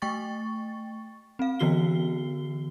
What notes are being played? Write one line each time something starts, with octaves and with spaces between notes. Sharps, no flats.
A3 G5 C#6 A6
C4 F5
D3 E3 B3 F#4 C7 G7